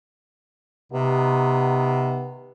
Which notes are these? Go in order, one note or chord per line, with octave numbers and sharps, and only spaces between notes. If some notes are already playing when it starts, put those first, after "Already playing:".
C3 D#3 B3